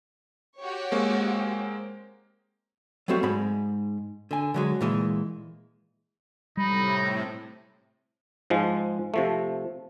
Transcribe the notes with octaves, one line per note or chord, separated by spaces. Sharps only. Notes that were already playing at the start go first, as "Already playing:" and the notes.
F#4 G4 C#5
G#3 A#3 C4
F#3 G3 A3 C4 F#4
G#2 G#3 B5
D3 G#5
D3 F#3 G#3
A#2 E3 G#3
A2 C3 G3 D#4 B5
G#2 F3 G#3
C3 F3 A3